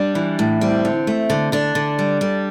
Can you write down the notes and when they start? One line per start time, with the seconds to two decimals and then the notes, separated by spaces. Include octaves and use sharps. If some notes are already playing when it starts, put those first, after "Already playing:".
Already playing: G3 D4
0.15 E3
0.39 A2
0.61 G3 C4
0.85 D3
1.07 A3
1.30 D3
1.52 D3 D4
1.75 D3
1.99 G3
2.21 G3